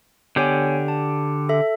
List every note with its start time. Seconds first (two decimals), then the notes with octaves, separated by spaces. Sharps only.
0.36 D3 B3 G4 C#5 G#5
0.88 A5
1.49 A4 E5